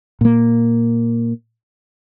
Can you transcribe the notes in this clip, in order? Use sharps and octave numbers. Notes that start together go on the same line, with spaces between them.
A#2 A#3